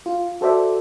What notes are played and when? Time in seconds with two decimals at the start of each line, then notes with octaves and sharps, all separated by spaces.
0.06 F4
0.41 F#4 A4 C5 D5 E5